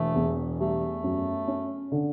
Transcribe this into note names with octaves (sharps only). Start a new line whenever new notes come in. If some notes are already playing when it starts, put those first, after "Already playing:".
Already playing: E1 A3
E2
G3 A3
F#2
C#4
D3